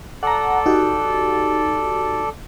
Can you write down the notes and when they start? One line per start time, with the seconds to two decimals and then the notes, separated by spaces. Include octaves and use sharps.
0.23 A4 D5 F#5 A#5
0.66 D#4 F#4 G4